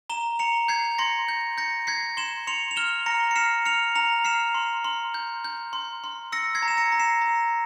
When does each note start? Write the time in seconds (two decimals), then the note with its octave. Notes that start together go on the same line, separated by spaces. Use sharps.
0.10 A#5 E7 G7
0.39 A#5 C#7 F7
0.68 G6 G#6 C7
0.98 C6 A#6 C#7
1.29 G6
1.58 G6 A#6 C#7
1.87 G6 G#6 C7
2.17 C6 E7 G7
2.47 C6 C#7 F7
2.71 F7
2.76 F6 E7 G7
3.06 A#5 A#6 C#7
3.31 C#7
3.36 F6 C7 E7
3.65 F6 C#7 F7
3.95 A#5 C#7 F7
4.25 F6 C7 E7
4.54 C6
4.84 C6
5.14 G6
5.44 G6
5.73 C6
6.04 C6
6.32 E6 A#6 C#7
6.55 G#6 C7
6.62 A#5
6.68 E7
6.77 A#6 C#7
6.92 A#5
7.00 C7 E7
7.21 A#5